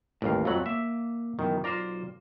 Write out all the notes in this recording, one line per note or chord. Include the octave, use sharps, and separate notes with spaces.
A1 D#2 A2 G3 F5
F2 F#3 F4 A4 B5
A#3 E5
F#2 B2 D#3 E3
B1 F4 C5 D5 A#5